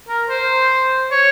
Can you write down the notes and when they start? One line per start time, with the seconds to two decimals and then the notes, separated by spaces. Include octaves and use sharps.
0.09 A#4
0.29 C5
1.12 C#5